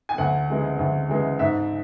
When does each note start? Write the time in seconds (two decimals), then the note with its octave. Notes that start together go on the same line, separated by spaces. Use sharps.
0.09 G#5
0.18 D2 F#5
0.48 C#3 E3 G#3
0.79 D2
1.09 C#3 E3 G#3
1.39 G#2 E5